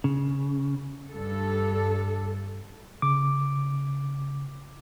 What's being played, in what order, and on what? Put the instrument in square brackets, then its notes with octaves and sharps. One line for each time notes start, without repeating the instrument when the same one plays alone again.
[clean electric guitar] C#3
[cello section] G2 A4
[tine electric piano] C#3 D6